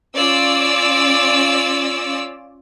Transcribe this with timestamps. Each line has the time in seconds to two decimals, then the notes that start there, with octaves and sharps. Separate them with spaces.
0.15 C#4 F4 D5 E6